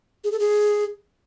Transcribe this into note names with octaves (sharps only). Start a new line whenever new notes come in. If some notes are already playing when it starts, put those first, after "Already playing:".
G#4
A4
G#4